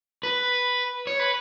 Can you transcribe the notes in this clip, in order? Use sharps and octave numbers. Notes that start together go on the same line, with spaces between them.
B4
C#5
B4